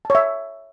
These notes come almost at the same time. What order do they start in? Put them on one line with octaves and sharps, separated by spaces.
A5 C#5 E5